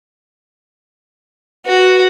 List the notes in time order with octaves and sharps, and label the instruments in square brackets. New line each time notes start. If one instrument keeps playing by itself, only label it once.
[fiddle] F#4 [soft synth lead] B4